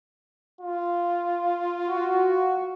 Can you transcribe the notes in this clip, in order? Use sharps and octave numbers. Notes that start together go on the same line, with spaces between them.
F4
F#4